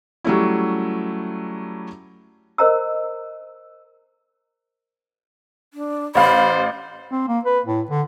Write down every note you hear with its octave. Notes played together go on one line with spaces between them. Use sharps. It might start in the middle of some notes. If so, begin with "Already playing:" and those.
F#3 G3 A3 C#4 E4
A#4 C5 D#5 A#5 E6
D4
A1 C5 F5 B5
C4
A#3
B4
A2
D3